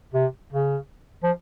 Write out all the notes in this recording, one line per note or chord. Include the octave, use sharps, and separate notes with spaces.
C3
C#3
F3